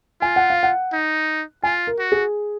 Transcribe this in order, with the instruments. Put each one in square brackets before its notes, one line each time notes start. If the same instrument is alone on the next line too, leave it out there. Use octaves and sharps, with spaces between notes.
[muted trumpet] F4 [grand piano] G#5
[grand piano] F#5
F5
F#5
[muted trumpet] D#4
[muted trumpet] F4 [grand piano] G#5
[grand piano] A#4
[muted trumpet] F#4
[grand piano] G#4